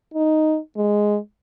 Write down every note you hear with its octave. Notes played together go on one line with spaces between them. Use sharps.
D#4
G#3